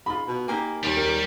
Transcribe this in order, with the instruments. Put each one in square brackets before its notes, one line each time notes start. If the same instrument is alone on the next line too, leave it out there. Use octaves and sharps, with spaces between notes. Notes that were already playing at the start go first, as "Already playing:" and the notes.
[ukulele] D#4 F4 [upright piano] B5
[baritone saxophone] B2
[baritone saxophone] A#3 [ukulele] D#4 G4 G#5
[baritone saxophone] D#2 [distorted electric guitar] G3
[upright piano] A#4